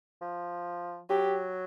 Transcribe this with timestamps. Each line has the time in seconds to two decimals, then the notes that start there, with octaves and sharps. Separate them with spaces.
0.22 F3
1.10 F#3 G4